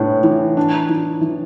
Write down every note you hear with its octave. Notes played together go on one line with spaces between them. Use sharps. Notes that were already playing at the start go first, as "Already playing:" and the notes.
Already playing: A2 B3 D4
E3
D4
E3
E3